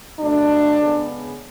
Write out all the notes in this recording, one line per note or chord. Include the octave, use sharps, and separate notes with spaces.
B2 F#3 A3 D4
C#3 G#3 B3